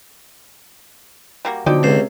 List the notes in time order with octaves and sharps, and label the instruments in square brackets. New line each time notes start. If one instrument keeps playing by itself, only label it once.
[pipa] G3 A#3 F#4
[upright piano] B2 F3 F#3 [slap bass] D3 [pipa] D#4 D5 G5
[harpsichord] C#2 C5 [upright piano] C3 C#4